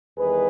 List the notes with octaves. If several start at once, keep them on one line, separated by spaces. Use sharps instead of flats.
E2 D#3 G3 G#4 B4